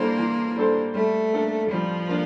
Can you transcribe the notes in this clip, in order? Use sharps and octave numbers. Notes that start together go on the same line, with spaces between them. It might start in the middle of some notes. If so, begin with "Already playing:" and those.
Already playing: E3 G3 A#3 D4 A4 C5
E3
G3 D4 A4 C5
G3 A3
A#3 D4 A4
F3 G3
A#3 D4